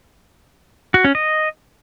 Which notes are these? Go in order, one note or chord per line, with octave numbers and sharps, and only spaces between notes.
F#4
C#4
D#5